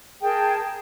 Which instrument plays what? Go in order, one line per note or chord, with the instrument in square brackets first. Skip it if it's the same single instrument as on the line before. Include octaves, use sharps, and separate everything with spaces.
[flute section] G#4 A#4 G5 A5